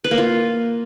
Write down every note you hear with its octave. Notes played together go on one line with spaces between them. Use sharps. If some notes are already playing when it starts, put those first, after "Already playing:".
B4
A#3
F4